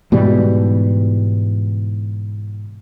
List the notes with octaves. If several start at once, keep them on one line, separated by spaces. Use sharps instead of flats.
G#2 B2 E3 G3